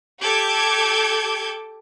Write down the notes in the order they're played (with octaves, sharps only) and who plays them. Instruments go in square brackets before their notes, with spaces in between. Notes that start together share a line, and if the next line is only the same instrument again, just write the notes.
[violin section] G4 A4 D6 G6 G#6